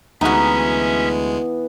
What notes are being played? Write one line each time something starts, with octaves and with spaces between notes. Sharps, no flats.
D2 E3 G#3 B3 C#4 D#4 F#4 E5